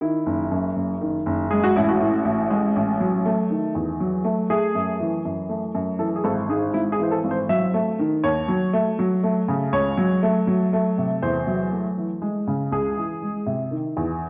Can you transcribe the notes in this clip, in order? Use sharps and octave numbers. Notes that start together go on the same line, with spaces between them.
D#3 E4
F#1
F#2
F#1
D#3
F#1
G#3 G#4
F#4
A1 E4
F#4
A2
A1
G#3
A1
F#3
A3
D#3
E2
F#3
A3
A3 G#4
F#2
E3
F#2
A3
F#2
E3 A4
G#4
G#1 A4
G#2 G#4
G#1 E4
G#4
E3 C5
A4
G#1
C5
F#3 E5
A3
D#3
D#2 C#5
F#3
A3
F#3
A3
C#3
C#2 C#5
F#3
A3
F#3
A3
C3
E2 C5
F#3
A3
E3
G#3
C#3
C#2 G#4
E3
G#3
C3
D#3
E2